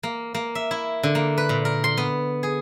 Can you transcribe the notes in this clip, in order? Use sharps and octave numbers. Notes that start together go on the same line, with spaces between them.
A#3
A#3
E5
E4
D3
A#3
B4
A#2
A#4
C6
B3
G#4